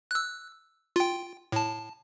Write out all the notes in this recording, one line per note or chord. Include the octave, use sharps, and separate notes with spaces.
E6 F#6
F4 G5
A2 A5